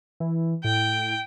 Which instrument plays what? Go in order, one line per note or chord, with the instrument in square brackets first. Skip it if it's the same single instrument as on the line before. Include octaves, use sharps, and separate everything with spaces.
[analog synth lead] E3
[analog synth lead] A2 [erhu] G5